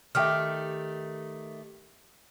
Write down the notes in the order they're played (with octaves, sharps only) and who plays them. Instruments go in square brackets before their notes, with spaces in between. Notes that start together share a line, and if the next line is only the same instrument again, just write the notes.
[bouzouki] D#3 A3 G4 [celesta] E5 G5 F6